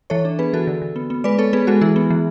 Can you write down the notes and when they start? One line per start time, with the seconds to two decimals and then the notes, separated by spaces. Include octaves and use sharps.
0.10 E3 A4 C#5
0.25 D4
0.39 B3 G#4 B4
0.53 E3 F#4 A4
0.67 D3
0.82 D3
0.96 B3
1.10 B3
1.24 G#3 B4 D5
1.38 B3 A4 C#5
1.53 B3 G#4 B4
1.67 G#3 F#4 A4
1.81 E3 E4 G#4
1.96 B3
2.10 E3